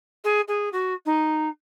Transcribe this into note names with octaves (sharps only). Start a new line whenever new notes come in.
G#4
G#4
F#4
D#4